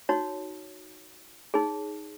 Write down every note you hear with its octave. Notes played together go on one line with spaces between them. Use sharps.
D#4 F#4 C#5
D#4 G#4 C#5